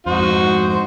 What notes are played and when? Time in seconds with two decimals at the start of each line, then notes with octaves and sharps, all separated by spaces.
0.06 F2 G#2 D#4 F#4 C5
0.68 C5